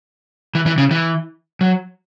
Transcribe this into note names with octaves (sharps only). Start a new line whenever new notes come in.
E3
E3
C#3
E3
F#3